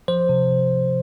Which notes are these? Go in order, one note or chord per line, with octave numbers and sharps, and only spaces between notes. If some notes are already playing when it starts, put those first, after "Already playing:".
F3 C5
C3